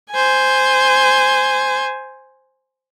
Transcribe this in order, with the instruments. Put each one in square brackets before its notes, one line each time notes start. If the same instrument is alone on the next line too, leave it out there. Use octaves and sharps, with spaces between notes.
[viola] C5 G#5